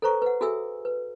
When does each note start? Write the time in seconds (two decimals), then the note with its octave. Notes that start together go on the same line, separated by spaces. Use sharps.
0.02 A4 B4 C5 A#5 C#6
0.22 B4 F#5
0.41 F#4 G#4 A4 E5 G#5 E6
0.85 B4